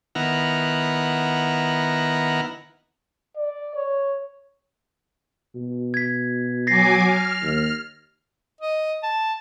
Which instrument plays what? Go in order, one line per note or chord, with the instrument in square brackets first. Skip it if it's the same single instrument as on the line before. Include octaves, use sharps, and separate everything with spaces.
[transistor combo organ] D#3 B3 E4 F#5 A#5 F6
[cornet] D5
C#5
[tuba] B2
[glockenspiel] G#6 B6
[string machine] F#3 G#5 D6 [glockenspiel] A6 A#6 C7
[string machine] F6
[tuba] D#2
[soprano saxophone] D#5
A5